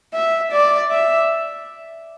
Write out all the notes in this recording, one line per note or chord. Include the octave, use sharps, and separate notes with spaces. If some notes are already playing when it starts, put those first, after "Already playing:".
E5
D5
E5